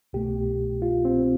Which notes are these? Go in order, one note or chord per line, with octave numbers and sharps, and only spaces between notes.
C2 B2 A3 G4
F4
C4